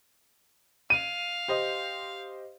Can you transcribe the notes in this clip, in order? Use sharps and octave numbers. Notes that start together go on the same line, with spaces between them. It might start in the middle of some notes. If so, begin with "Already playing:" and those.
F5 D#7
G4 C5 D#5